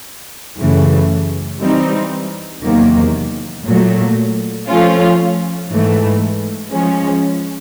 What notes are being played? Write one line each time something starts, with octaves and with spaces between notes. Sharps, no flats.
F#2 C#3 E3 A3
E3 G3 C4 D#4
E2 C3 D#3 F#3 A#3
A#2 F#3 A3
F3 A3 C#4 F4
G#2 E3 A3
F3 G#3 C#4